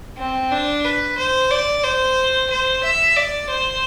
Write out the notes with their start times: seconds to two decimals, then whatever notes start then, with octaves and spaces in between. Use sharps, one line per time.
0.18 C4
0.52 D4
0.85 B4
1.18 C5
1.51 D5
1.84 C5
2.50 C5
2.83 E5
3.17 D5
3.50 C5